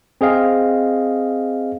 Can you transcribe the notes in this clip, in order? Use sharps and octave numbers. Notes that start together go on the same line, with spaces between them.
C4 G#4 D#5 F5